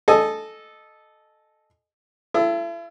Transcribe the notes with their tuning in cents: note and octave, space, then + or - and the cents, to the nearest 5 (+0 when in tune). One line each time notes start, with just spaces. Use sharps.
A4 -10 D#5 -15 G#5 +5
E4 +40 A4 +0